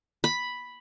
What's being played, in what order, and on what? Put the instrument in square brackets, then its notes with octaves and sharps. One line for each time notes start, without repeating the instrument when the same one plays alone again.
[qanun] B5